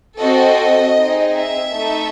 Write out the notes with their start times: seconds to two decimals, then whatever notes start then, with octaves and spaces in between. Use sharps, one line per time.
0.20 C4 F#4 A4 D#5
0.96 C4 D#4 G#4
1.34 E5
1.73 A3 D#4 A4